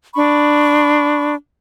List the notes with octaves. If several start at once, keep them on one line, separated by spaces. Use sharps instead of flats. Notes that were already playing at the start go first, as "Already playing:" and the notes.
D4 B5 C#6